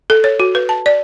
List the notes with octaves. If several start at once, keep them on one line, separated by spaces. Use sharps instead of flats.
A4
C#5
F#4
B4
A5
D5